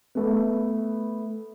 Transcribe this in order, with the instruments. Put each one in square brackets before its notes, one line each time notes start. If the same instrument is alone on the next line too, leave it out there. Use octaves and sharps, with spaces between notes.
[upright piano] A3 B3